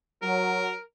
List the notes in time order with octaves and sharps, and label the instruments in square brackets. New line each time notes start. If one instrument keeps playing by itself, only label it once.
[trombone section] F#3 [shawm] A#4